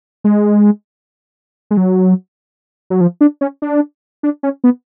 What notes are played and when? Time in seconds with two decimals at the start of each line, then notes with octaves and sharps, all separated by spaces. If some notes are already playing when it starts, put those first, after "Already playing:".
0.24 G#3
1.71 G#3
1.77 F#3
2.90 F#3
3.01 F3
3.21 D4
3.41 C#4
3.62 D4
4.23 D4
4.43 C#4
4.64 B3